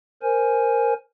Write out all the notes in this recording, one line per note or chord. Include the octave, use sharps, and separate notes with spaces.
A#4 C5 G#5